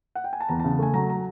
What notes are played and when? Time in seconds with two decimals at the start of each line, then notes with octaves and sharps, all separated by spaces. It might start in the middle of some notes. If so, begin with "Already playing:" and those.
0.15 F#5
0.24 G5
0.33 G#5
0.41 A5
0.49 E2 A#5
0.60 C#3 A5
0.79 A3 G#5
0.94 F#3 A#5
1.10 A#5